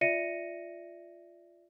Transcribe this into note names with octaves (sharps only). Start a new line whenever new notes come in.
F4 D5 E5 A#6 C#7 D#7